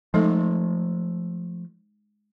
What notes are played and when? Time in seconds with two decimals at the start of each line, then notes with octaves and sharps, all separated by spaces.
0.14 F3 G#3 A3 D#4 A4